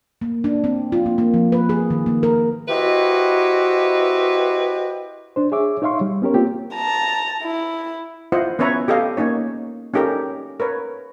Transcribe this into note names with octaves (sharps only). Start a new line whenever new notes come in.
A#3
D4
C4
F4
A#3
A#3
F3
B4
G#4
D#3
A#3
A#4
E4 F#4 G4 B4 C5 D#5
D4 C5
G#4 C#5 E5 D6
D#4 C#5 E5 F5 C6 C#6
G3
B3 C#4 G4 A#4 C#5
A#3 C4 F4 G4
A5 A#5
E4
E4 F4 C5 D#5 F#5
B3 C#4 B4 C#5 E5 A#5
G4 A4 D#5 F5
A#3 C#4 D#4 C#5
C#4 D#4 G4 A4 A#4
A#4 B4 C#5